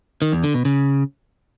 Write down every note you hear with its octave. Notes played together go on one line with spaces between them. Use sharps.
D#3
E2
D3
B2
C#3